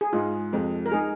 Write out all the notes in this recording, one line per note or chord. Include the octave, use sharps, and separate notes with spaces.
G#4
G#2 G#3 D#4 F4
F2 C3 F3 G#3
A#4
G#3 D#4 G#4